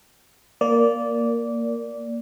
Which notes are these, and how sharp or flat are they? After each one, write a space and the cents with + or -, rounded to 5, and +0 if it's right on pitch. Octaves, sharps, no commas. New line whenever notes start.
A#3 +0 D5 -15